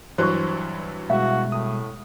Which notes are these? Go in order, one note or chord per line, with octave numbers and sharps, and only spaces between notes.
G2 E3 F#3 C5 C6 C#6
B2 G3 G#3 F#4 E5 F5
A2 D#6